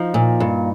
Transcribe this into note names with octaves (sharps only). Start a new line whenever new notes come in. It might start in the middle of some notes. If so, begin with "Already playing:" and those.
Already playing: F3 D#4
A#2
G2